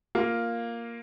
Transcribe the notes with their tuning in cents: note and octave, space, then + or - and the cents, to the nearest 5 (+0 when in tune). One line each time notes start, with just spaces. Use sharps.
A#3 +0 F4 +0